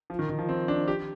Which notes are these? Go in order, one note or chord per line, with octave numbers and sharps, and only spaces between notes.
F3
D#3
D#3
F3
C4
D4
G4